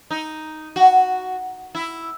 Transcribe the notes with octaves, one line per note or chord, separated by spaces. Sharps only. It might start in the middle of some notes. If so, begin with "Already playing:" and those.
D#4
F#4
E4